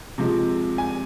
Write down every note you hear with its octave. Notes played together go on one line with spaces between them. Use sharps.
C3 F3 G#3
G#5